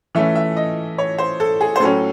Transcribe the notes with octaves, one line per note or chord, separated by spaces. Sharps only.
E3 A3 C#4 E5
E5
D#5
C#5
C5
A4
G#4
C5
A2 F#3 C#4 A4